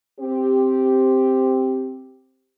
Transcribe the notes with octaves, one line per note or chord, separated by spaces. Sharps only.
C4 G4